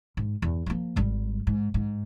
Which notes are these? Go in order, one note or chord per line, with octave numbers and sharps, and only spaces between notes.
G#2
E2
F3 A#3
G#1 G3
G#2
G#2